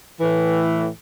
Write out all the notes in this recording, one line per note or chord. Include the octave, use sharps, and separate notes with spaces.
A2 E3